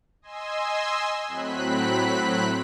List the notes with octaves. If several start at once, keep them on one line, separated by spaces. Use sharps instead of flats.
D#5 G#5 C6 E6
A2 F#3 C4 B5 F#6 B6